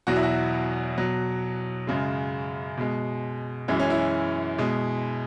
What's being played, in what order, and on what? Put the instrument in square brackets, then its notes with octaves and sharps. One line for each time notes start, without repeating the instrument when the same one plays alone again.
[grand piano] E2 B2 F#3 F#4
E4
F#4
B2 F#3
F#2 C#3 G#3
B2 G#3
F#2 E3 G#3 E4
C#4
E4
B2 G#3